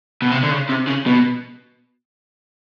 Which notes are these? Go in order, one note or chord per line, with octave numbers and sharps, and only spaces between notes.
B2
C3
D3
C#3
C3
C#3
B2